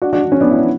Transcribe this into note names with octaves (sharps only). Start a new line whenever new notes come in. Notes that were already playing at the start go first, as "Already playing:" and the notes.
D4 F#4
D4 F#4
D4
C#4
B3 D4
E4
D4